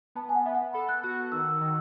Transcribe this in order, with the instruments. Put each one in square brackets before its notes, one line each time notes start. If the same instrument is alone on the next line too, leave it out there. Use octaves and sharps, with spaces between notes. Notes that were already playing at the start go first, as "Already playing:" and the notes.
[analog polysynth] B3 [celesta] A5
[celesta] G#5
F#5
[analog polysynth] B3 [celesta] E5
[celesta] F#5
[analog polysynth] A4 [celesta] B5
[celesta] F#6
[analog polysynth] F#4 [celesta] F#6
[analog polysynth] D#3 [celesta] E6
[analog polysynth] D#3